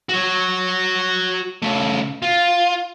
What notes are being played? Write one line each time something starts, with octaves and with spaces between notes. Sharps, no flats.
F#4 C#5
C#3 A3
F4